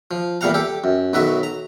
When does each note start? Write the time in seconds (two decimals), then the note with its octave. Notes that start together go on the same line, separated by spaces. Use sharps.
0.11 F3
0.41 E2 A#2 G3 F5 F#5 A#5
0.54 G4 A4
0.84 F#2
1.13 B1 D#3 F#3 F#4 B4 E5
1.43 A#5